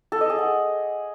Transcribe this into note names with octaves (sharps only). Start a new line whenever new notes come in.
A4
D#5
G#4
F#5